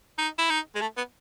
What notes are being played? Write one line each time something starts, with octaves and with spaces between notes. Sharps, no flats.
D#4
E4
D#4
G#3
A3
B3